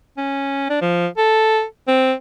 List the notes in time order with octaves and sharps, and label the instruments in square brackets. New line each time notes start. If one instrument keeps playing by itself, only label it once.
[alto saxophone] C#4
D4
F3
A4
C4